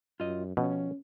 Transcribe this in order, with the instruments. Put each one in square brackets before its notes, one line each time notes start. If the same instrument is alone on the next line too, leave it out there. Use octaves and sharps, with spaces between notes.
[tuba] F#2 [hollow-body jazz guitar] F4 D#5
[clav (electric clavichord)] B2 [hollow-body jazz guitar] F3 [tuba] C#4